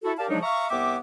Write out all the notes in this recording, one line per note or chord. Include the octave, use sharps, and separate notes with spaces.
E4 F#4 A4
G4 A#4 D5 F5 A5
C#3 F3 F#3 G#3 D4 D#4
E5 F5 A#5 C#6
C2 B3 E5 G5 D6